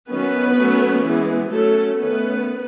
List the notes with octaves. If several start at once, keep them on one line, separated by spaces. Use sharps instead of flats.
D#3 F#3 B3 C#4 B4
F#3 A3 C#4
E3 G#3 B3
F#3 A3 C#4 A4
D#3 A3 B3 C#4 B4